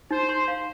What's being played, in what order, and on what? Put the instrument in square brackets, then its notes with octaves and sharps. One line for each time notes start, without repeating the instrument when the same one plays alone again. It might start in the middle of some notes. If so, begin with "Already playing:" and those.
[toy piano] D#4 [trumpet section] C5
[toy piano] C6
F5